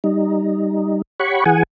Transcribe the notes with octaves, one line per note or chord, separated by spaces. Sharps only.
G3 D#4
G4 C#5 F#5 B5 C#6
E3 G#4 F#5 G#5